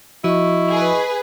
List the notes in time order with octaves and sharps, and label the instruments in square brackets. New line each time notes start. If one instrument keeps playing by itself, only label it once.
[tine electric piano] F3 F#4 [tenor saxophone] E4 [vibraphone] D#5 C#6
[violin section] G#4 B4